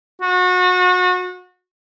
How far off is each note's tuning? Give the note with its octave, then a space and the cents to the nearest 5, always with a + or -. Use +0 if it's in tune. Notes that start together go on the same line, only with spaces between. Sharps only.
F#4 -30